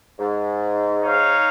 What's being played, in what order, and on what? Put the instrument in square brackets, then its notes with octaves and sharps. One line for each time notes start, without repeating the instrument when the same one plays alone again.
[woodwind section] G#2
[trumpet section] D#4 C#5 F5